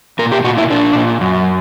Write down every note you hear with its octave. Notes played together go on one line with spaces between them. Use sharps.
A#2 A#4
G4
A#2 F#4
E4
A#2 D4
A#2
F#2